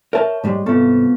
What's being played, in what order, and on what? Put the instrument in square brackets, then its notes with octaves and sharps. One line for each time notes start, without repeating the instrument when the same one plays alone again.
[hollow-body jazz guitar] A#4 E5 A5 [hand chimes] C#5
[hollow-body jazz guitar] G#2 G3 G#3
[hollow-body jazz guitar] C2 G#2 A4 [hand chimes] B3 C4 F4